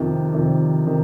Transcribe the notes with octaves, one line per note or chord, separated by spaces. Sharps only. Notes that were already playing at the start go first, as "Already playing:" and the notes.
Already playing: F2 C3 D#3
F2 C3 D#3
C3 D#3